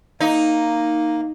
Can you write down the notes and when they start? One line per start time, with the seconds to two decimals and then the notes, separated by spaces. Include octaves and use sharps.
0.20 A#3 D#4